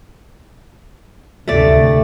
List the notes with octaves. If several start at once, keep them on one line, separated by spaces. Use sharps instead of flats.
D2 C3 A3 D5